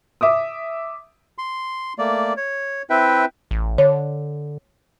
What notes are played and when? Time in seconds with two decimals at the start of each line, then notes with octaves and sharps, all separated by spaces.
0.21 E5 D6 D#6
1.38 C6
1.99 A3 A#3 D5
2.37 C#5
2.90 C4 E4 B4 E5 G5
3.51 A1
3.78 D3 C#5